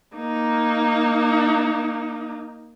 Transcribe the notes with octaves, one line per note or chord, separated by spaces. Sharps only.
A#3 D#4